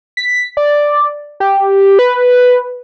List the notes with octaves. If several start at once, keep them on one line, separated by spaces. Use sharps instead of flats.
B6
D5
G4
B4